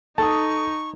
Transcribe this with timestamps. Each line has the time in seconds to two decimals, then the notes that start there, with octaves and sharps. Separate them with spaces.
0.18 D#4 A4 A5 C#6 D#6